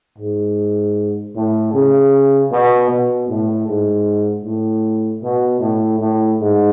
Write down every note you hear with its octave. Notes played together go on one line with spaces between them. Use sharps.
G#2
A2
C#3
B2
B2
A2
G#2
A2
B2
A2
A2
G#2